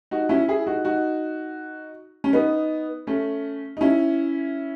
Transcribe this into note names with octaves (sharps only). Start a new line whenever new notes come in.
D#4 F#4
C#4 E4
E4 G#4
D#4 F#4
D#4 F#4
C#4
B3 D#4
A3 C#4
D#4
C#4 E4